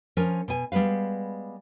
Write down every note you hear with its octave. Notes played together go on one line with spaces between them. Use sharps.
F3 C#4 A#4
B2 G#5
G3 G#3 B3 B4 F5